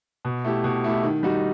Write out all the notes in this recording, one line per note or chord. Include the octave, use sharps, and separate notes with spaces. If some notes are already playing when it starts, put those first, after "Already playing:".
B2
A3 E4 G4
B2
A3 E4 G4
D#3
G3 D#4 F#4